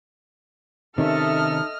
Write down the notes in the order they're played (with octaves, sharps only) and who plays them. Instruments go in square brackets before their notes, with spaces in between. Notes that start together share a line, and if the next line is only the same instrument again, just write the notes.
[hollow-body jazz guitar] C3 D#3 C#4 [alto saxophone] D#4 [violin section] A4 E5 [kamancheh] D#5 F6